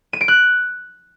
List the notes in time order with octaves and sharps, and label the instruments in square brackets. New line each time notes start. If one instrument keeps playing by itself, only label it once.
[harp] D#7
D7
F#6